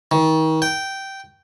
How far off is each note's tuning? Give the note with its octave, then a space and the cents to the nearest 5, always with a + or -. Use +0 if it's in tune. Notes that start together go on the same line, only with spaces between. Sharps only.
D#3 +35
G5 -10